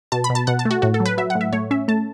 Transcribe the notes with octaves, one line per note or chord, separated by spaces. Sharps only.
B2 A5
B5
B2
A5
B2 F#5
A5
A3
F#4
A2 F#4
A4
F#3
B4
F#3 E5
F#5
A2
E5
A3 C#5
C#4 E5
A3 A5